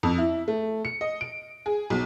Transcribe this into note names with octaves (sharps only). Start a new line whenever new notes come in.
F2
E4
A3
C#7
D#5
D7
G#4
B1